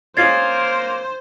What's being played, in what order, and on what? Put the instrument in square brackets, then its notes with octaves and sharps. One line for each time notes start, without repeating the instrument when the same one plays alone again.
[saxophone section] A#3 [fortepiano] C#4 F4 G#4 [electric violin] C5 [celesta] G#6 A6 C7